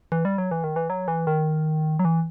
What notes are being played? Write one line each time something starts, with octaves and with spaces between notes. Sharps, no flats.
E3
G3
F#3
E3
D#3
E3
F#3
E3
D#3
F#3
E3